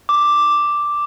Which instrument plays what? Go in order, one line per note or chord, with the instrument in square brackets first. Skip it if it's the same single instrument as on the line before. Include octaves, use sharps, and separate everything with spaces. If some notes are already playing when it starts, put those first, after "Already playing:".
[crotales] D6